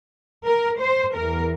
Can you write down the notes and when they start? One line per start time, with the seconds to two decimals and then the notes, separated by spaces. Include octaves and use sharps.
0.45 A#4
0.80 C5
1.15 E2 E3 A#4